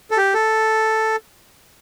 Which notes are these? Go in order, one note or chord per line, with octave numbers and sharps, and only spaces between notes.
A4
G4
A4